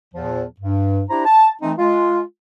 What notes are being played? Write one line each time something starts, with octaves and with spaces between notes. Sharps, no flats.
E2 A#2 F3
G2
D4 E4 G4 C5 A#5
A5
E3 A3 C4 D#4
G#3 F4